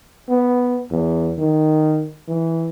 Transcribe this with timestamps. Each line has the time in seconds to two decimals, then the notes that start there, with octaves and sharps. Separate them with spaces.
0.28 B3
0.90 E2
1.38 D#3
2.28 E3